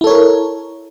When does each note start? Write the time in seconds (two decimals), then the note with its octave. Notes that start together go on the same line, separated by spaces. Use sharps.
0.01 E4
0.04 A4
0.07 C#5
0.10 A#4